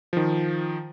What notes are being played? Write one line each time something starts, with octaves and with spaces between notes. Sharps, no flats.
D#3 F3